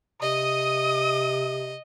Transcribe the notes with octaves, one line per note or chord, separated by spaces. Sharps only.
C3 D#5 D#6